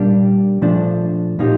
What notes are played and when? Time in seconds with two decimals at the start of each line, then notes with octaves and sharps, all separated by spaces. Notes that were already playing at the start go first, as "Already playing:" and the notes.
Already playing: A#2 G3 A#3 D4 G4
0.62 A#2 F3 A3 D4
1.39 A#2 F3 A#3 D#4 G4